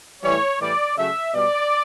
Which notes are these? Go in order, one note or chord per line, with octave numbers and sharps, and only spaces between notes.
A2 E3 G3 C#5
A2 E3 G3 D5
C#3 F#3 A3 E5
B2 G3 D5